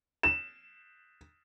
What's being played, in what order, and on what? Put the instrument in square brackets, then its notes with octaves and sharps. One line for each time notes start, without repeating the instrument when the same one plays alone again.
[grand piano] E7